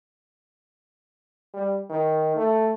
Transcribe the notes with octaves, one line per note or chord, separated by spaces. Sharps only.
G3
D#3
A3